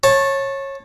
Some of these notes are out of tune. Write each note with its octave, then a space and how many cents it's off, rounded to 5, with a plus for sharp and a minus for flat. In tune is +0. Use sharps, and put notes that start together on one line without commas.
C#5 -20 A5 +0